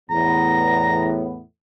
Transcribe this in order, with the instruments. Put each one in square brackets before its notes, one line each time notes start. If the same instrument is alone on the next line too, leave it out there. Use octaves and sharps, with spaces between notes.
[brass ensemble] E2 A2 B3 [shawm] A#5